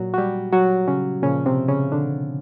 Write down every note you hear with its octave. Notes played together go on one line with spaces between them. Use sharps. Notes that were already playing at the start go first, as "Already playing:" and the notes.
Already playing: A#2 F#3 F#4
F#4
G3 G4
F#3 F#4
C#3 C#4
A#2 C#3 F3 C#4
C3 C4
C#3 C#4
D3 D4